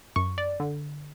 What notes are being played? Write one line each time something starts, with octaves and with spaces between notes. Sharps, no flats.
F#2 C#6
D5
D3